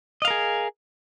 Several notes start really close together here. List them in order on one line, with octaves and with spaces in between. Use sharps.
D#5 F5 A#4 G#4